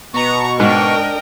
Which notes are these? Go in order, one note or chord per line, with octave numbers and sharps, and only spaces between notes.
B2 B3 A#5 C#6
G#2 D4 A#4 D#5 G5